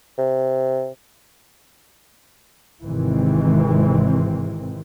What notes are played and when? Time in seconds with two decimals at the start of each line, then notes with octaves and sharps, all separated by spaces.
0.18 C3
2.82 G#1 C3 D#3 E3 G#3 C4